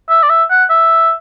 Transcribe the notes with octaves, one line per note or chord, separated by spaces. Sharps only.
E5
D5
E5
F#5
E5